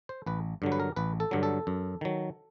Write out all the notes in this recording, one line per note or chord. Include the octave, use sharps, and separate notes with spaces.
C5
A1 B4
G2 D3 F#3
B4
A#4
A1 B4
A4
G2 D3 F#3
A4
F#2
D#3 F#3